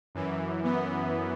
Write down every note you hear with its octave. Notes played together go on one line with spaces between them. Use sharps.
F#2 E3
B3